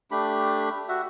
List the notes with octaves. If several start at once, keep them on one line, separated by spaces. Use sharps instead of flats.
A3 D4 G4 B5
F#4 E5